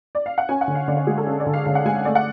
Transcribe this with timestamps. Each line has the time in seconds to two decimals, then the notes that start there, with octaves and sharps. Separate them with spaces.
0.15 D5
0.26 F5
0.38 F#5
0.49 C#4 G#5
0.61 F#5
0.68 D3
0.75 F5
0.88 D3 D5
0.97 C#5
1.07 G#3 G#4
1.18 A4
1.27 C#4
1.40 D5
1.46 D3
1.54 F5
1.66 D3 F5
1.75 F#5
1.86 G#3 G#5
1.95 F5
2.05 A3 D5
2.15 F#5